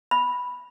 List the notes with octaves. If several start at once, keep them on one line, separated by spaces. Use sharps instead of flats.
B5